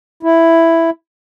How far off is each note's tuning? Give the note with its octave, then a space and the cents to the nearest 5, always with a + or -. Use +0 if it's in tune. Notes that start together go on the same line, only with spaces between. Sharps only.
E4 +5